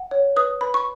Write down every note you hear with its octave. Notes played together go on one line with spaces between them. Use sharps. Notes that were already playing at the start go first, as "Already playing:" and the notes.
Already playing: F#5
C#5
B4 D#6
B4 B5
C#6